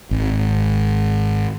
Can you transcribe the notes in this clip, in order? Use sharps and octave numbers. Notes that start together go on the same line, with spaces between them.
G#1